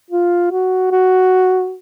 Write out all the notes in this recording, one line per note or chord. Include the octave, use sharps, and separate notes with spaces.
F4
F#4
F#4